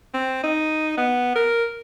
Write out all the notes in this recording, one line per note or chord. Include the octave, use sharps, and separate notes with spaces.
C4
D#4
B3
A#4